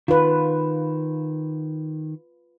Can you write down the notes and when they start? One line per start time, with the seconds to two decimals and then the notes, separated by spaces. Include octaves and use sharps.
0.08 D#3 F4 B4